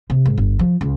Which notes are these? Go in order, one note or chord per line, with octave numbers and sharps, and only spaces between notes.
C3
G#2
G1
F3
C#2